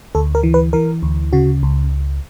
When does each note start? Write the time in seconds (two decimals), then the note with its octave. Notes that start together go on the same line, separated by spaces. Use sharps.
0.15 D2 A4
0.35 A#4
0.43 E3
0.54 B4
0.73 E3 A#4
1.03 D2
1.33 C#3 F#4
1.63 C#2